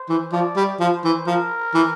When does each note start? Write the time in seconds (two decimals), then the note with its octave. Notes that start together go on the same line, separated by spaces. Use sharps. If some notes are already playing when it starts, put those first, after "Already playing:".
Already playing: C5
0.09 E3
0.32 F3 D5
0.56 G3
0.80 F3 C5
1.04 E3
1.27 F3 A#4
1.74 E3